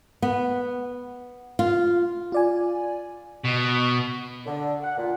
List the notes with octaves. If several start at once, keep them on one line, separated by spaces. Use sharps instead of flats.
B3
F4
F4 D5 G#5
B2
D3
F#5
A#2